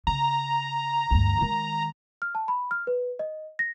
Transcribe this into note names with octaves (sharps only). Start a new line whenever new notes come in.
C#3 A#5
D2 G2
D#3 G#3
F6
A5
B5
F6
B4
D#5
A#6